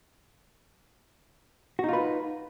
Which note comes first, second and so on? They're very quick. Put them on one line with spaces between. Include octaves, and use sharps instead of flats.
F#4 D#4 F4 B4